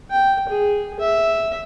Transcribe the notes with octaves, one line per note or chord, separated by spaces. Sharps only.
G5
G#4
E5